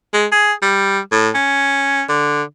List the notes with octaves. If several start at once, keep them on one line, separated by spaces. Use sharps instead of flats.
G#3
G#4
G3
A2
C#4
D3